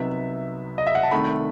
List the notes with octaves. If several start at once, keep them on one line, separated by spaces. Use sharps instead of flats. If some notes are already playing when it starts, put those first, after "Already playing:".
Already playing: C2 C3 F#3 B3 D#4 E5
D#5
E5
F#5
A5
C2 C3 D#3 A3 B5